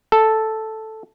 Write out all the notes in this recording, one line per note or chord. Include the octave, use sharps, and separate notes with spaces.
A4